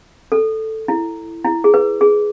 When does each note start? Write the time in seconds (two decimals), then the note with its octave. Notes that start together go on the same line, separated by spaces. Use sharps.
0.32 A4
0.88 E4
1.45 E4
1.64 G#4
1.74 B4
2.01 G#4